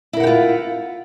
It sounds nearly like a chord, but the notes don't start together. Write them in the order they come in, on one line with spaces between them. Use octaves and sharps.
E4 A#4 F#5 G4 F4